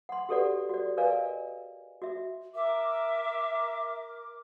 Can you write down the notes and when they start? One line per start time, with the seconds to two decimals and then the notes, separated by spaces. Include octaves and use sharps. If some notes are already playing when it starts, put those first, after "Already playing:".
0.09 F#5 C6
0.29 F#4 G4 A4 B4 D5 F#5
0.69 F#4 D5
0.97 A#4 B4 D5 D#5 F5 G#5
2.02 F#4 E5
2.55 A#4 E5 D6